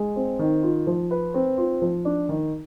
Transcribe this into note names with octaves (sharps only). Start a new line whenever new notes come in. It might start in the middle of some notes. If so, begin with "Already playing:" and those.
Already playing: G#3
C4
D#3
F4
F3
B4
C4
F4
F3
D4
D#3